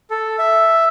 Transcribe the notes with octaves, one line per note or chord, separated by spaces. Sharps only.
A4
E5